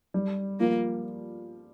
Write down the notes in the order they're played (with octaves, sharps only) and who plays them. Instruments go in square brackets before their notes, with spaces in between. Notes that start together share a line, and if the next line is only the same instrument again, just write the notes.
[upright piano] G3
[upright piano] F3 [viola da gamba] A#3